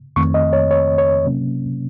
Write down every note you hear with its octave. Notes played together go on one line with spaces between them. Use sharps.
F2 D#3 A3 C4 C#6
D#5
C#5
C#5
C#5
C3 F#3 A#3 C#4